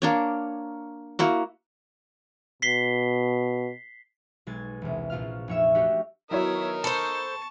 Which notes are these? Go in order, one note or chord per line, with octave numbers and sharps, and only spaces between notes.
A#3 D4 C#5
A#3 E4 F#4
B2 B6 C7 G7
B1 G#3 G#6 A6
E1 C2
A#1 F4 F5 F6
F1 C#5 E5
A3 D4 F#4 G4 A4 C#5
F#3 B3 D#4 E4 A#4 C#5 E5 D#6
A4 C5 A5 B5 C#6